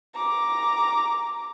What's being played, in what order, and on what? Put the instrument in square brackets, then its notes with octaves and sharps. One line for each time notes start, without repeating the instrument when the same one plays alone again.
[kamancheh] A#5 D6